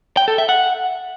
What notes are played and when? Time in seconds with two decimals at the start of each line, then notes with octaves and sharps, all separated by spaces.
0.17 G5
0.28 A4
0.38 E5
0.49 F#5